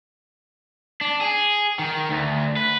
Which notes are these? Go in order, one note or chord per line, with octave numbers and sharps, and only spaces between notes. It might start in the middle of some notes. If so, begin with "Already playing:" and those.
D4
G#4
D#3
D2
B4